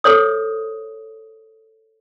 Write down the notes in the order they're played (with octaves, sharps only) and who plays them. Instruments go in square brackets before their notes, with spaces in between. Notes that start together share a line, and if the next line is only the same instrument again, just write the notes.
[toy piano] A4 C5 C#5 D#6